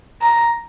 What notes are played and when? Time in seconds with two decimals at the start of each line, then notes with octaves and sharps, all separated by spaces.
0.22 A#5